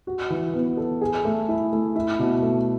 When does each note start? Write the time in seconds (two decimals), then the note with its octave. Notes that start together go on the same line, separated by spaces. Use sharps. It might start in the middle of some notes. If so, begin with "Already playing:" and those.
0.07 F#4
0.30 E3
0.53 B3
0.77 A4
1.01 G#4
1.25 A3
1.49 E4
1.73 A3
1.96 E4
2.19 B2
2.42 A3